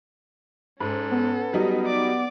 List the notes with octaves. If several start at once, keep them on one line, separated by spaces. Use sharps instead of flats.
G#2 C#4 A4
B3
F#3 G3 D#4
D5 D6